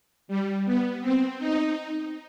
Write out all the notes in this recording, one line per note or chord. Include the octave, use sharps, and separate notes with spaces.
G3
B3
C4
D#4